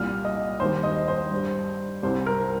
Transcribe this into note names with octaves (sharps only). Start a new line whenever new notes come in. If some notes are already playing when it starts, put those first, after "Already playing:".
Already playing: C2 A#2 G3 F6
D#5
D#2 D#3 G3 C5
D#5
C5
G2
G3
C2 C3 G3 C5
A#4